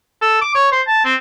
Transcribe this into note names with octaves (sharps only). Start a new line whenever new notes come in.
A4
D6
C#5
C5
A5
C4